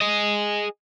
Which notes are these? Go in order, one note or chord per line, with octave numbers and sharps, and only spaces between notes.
G#4 D#5